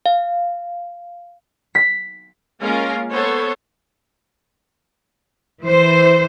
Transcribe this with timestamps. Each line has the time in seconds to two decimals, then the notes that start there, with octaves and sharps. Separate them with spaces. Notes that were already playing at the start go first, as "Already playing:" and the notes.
0.06 F5
1.75 B6
2.61 G#3 A#3 C#4 F4 A#4 F5
3.11 B3 A4 C5 C#5
5.63 E3 C5